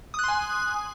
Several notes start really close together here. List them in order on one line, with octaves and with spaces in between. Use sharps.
D#6 F#6 C6 G#5